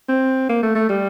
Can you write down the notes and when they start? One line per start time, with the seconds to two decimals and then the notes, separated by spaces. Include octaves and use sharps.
0.09 C4
0.49 A#3
0.63 A3
0.75 A3
0.89 G3